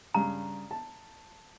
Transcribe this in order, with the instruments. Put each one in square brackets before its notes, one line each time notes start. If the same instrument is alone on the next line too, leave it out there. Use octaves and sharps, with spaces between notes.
[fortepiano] G2 C#3 [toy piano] A#5
[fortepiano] A5